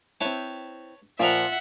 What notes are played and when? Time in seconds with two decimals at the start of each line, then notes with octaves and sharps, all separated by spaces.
0.21 C4 E4 B4 C#5 A5
1.20 A#2 F3 F4 A#4 E5 F#5